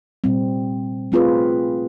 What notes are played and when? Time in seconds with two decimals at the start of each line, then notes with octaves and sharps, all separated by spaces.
0.24 A#2 G3 C4
1.12 A3 C4 F4 G#4 B4